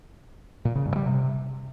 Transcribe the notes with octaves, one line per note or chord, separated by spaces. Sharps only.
A#2
C#3
G2
G3
C3